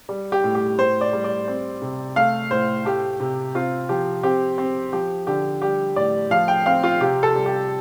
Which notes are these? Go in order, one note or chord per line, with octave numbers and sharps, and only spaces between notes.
G3
G4
A2
G4
A2 C5
D5
G3
D5
C4
C3
A3 F5
A2 C5
A3 G4
C3
C4 F4
F3 G4
C4 G4
C4
F3 G4
D3 G4
G3 G4
A2 D5
F3 F5
G5
C4 F5
F4
C3 G4
A4
G3
G4